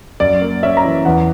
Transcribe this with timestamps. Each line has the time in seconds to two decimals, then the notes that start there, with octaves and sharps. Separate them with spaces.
0.20 F#2 D5
0.42 A#3
0.63 C#4 E5
0.77 A#5
0.84 E3
1.05 E2 F#5